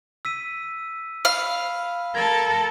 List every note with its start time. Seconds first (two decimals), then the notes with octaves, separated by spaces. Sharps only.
0.25 E6 B6 D#7
1.25 F5 B5
2.15 A4 A#4 G#6